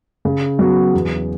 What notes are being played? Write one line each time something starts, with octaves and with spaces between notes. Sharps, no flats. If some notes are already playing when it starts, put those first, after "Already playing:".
C#3
F#3 B3 F#4
E2